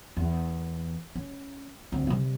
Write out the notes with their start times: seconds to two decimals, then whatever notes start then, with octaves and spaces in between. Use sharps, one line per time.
0.17 E2
1.15 C#4
1.92 D2 C4
2.07 C3 G3